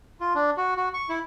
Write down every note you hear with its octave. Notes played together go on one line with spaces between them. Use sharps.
F4
D4
F#4
F#4
C#6
E4